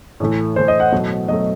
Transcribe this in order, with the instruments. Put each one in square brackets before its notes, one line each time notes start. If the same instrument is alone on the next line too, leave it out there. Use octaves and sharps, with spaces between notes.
[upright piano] A2 E3 A3
A2 E3 A3 C5
D#5
F#5
B2 F#3 A3
B2 F#3 A3 D#5